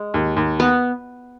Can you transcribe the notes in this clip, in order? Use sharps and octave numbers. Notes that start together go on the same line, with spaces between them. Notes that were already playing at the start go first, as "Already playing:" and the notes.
Already playing: G#3
D#2
D#2
B3